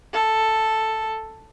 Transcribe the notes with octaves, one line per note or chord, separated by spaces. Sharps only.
A4